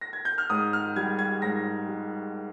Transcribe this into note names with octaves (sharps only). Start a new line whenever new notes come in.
A#6
G#6
G6
F6
G#2 D#6
F6
G3 G#6
G#6
G#2 A#6
G3